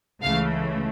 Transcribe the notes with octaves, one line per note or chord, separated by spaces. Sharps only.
C#2 C#3 E3 A3 F5